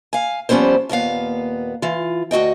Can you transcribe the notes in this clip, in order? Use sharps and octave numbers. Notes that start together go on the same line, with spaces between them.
F5 G#5
F3 G3 B3 C#4 A#4 C5
D#2 A#2 B3 F5
E3 F4
D2 F#4 D#5 G5